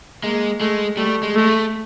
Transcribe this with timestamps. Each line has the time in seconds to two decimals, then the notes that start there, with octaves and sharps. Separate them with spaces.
0.24 G#3 A#3
0.60 G#3 A3
0.97 G3 A3
1.23 G#3
1.35 G#3 A3
1.47 A3